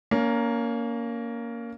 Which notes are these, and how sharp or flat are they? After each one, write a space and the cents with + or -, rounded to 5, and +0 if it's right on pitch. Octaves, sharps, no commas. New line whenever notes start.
A#3 +0 C#4 +30